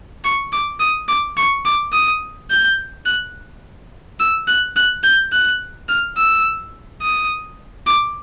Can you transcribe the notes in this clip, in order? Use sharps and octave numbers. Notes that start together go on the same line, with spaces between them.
C#6
D6
D#6
D6
C#6
D6
D#6
G6
F#6
E6
F#6
F#6
G6
F#6
F6
E6
D#6
D6